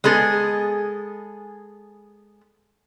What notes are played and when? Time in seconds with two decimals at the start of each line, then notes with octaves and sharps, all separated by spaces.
0.04 G#3 B3 G#4 A4